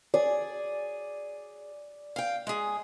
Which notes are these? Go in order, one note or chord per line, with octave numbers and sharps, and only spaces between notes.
G#4 D5
F5 G5
G#3 G#4